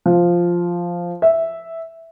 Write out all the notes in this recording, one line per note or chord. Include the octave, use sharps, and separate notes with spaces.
F3
E5